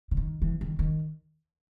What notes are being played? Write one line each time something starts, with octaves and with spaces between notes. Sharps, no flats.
C#3
D#3
E3
D#3
D#3